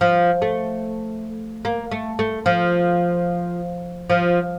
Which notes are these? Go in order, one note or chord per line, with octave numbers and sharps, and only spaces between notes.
F3
A3
A#3
A3
A3
F3
F3